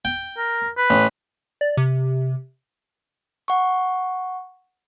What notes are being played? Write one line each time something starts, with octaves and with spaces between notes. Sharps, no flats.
G5
A#4
B4
A1
D5
C3
F#5 C#6